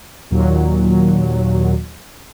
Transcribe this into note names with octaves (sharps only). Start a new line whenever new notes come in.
D#2 A#2 F#3